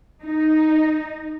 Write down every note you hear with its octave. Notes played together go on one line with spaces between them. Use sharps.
D#4